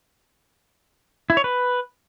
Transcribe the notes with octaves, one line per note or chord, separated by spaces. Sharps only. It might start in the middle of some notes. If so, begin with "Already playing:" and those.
E4
C#5
B4